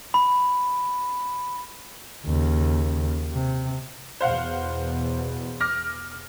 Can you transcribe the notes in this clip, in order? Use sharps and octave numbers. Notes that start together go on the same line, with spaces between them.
B5
D#2 C#3
C3
E2 B2 C5 F5 F#5
D6 F6 A#6